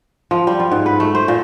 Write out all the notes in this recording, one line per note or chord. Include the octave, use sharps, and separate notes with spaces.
F3
G3
F4
G#2
B4
A3
C5
A#2